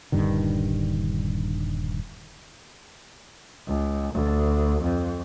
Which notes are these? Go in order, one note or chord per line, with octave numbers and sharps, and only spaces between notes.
D#1 G2 D3 D#3
C#2
D2
F2